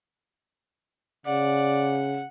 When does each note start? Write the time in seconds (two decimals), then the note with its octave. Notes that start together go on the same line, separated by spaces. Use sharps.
1.26 C#3 D5 F#5